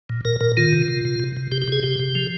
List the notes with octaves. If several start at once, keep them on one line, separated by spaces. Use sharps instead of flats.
A#2
A#2 A#4
A#2 A#4
D#3 F4
C3
C3
C3
C3
C3
C3 G4
G4
C3 G#4
C3 G4
C3
F3